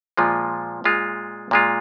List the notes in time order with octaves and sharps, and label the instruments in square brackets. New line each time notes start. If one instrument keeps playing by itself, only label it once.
[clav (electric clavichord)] A#2 F3 G#3 F4
A#2 G#3 F4
A#2 G#3 F4